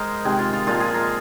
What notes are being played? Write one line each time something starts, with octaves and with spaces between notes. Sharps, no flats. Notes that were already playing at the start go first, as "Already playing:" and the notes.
Already playing: G#3 A#4 C5 D#5
C3 D#3 G#3 G#4
F4
F4
A#2 F3 G#3 F4
G#4
A#4